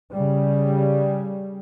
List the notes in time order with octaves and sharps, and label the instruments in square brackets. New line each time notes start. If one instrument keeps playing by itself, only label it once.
[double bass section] C#3 G3